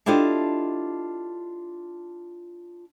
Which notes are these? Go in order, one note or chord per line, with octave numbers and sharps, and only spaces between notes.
D4 E4 F4 G4 A4 D#5